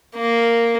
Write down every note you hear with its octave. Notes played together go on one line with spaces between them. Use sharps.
A#3